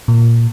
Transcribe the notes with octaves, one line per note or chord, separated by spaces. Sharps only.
A#2